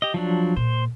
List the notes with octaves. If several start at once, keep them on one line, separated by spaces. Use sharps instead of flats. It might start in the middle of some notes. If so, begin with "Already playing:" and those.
G4 D#5
F3 F#3 D4
A#2 C5